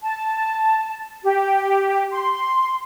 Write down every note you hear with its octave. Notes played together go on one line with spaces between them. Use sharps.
A5
G4
C6